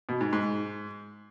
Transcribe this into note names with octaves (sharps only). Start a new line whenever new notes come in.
B2
G#2
G#2